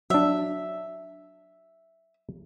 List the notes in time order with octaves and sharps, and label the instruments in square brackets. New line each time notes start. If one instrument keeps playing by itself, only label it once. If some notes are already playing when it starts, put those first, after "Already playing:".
[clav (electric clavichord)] F#3 D4 [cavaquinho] E5